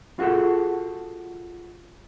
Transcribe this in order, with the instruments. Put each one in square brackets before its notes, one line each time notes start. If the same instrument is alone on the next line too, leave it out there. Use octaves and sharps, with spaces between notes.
[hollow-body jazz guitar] F4 F#4 G#4 A4 F#5